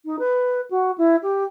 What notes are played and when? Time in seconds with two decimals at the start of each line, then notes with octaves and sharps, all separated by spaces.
0.05 D#4
0.19 B4
0.71 F#4
0.98 E4
1.23 G4